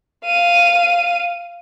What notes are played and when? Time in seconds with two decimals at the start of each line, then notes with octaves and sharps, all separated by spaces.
0.26 F5 D#7